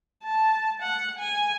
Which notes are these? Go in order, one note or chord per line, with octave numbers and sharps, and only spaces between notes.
A5
F#5
G#5